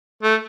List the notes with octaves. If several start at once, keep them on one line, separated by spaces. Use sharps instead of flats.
A3